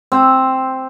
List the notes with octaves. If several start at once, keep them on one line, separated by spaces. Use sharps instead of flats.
C4